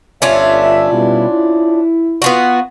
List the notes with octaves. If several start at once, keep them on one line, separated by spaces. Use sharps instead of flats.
G1 C#4 D4 F4 E5
B2 G3 E4
E4
B3 F4 F#4